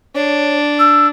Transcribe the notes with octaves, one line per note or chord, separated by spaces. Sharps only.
D4 C#5
E6